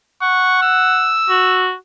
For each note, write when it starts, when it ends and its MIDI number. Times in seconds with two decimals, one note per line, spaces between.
0.22 1.16 78
0.22 0.60 85
0.63 1.66 88
1.29 1.74 66